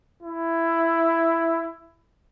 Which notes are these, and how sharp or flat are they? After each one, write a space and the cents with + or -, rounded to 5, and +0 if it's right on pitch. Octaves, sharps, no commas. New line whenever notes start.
E4 +10